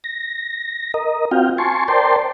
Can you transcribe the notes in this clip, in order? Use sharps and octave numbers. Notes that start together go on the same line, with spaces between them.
A#6
A#4 D#5
C4 F4 F#4 F5 G5
G#5 A5 C6 C#6
A#4 C5 D5 G5 A5 C6